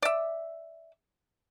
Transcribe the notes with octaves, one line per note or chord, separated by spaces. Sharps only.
D5 E5